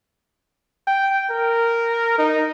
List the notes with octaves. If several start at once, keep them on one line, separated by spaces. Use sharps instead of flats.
G5
A#4
D#4